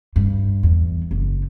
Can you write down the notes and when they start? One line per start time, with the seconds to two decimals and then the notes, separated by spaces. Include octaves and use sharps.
0.16 G2
0.63 E2
1.11 F#1